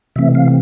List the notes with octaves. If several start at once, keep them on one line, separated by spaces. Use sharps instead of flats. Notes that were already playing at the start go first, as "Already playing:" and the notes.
C3 E3 A3 C4 E5
F5